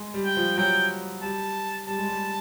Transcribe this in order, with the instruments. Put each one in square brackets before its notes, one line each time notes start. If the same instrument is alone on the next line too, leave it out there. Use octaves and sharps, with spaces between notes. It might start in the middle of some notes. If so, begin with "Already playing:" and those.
Already playing: [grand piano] G#3
G3
[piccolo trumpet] G5
[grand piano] F3
[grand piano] F#3 [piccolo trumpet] G5
[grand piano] G3 [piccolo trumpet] A5
[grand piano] G3 [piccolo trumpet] A5
[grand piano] G#3
G3